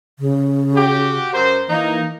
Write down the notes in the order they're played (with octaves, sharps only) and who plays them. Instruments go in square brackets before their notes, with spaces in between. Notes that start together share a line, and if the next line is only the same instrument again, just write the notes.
[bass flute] C#3
[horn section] F#4 G4
F#2 A#4 C5
[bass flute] E3 [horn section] A#3 D#4